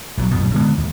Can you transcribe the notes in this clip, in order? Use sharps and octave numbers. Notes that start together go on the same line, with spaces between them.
A#1 E3 F#3
A#1 F#2 B2
D3 G#3 B3
D#2